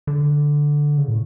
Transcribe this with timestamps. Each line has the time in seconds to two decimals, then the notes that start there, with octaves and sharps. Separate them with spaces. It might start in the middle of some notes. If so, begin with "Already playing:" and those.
0.07 D3
0.98 C#3
1.08 A2